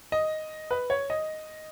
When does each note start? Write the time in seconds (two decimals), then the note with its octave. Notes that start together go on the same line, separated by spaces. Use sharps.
0.12 D#5
0.71 B4
0.90 C#5
1.10 D#5